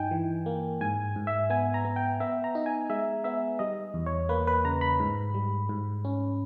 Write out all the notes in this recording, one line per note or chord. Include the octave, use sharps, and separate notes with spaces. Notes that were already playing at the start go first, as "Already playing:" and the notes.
Already playing: G2 D#4 G5 G#5
E3
A#3
G#2 G#5
G#2
E5
B3 G#5
A#5
B3
G5
B3 E5
A#5
D#4
G#5
G#3 E5
B3 E5
G3 D#5
E2
C#5
A#3 B4
B4
C#3 A#5
B5
G#2
G3
G#2
C#4